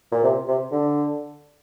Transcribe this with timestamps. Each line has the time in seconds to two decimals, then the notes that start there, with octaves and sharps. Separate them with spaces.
0.11 A#2
0.23 C3
0.48 C3
0.71 D3